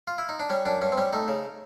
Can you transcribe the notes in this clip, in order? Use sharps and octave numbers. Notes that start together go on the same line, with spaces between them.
F4
E4
D#4
D4
G3 C#4
F#2 D4
G2 C#4
C4
G3 C#4
A3 D#4
C#3